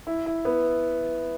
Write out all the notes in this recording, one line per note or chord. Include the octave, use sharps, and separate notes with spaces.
E4
E4
B3